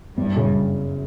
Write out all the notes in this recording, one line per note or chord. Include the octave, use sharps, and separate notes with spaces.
F#1 G2 G3
F#2 C#3